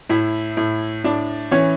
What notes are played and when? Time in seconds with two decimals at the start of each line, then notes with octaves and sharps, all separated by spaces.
0.09 A2 E4 E5
0.57 A2
1.04 A2 D4 D5
1.51 E3 C#4 C#5